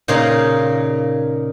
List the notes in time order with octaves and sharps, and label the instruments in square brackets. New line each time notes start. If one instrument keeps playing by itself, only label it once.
[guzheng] A#2 C#3 D#4 G#4 A#4 F5